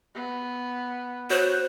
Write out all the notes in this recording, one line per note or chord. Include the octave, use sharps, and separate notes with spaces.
B3
F#4 C5 C#5 F#6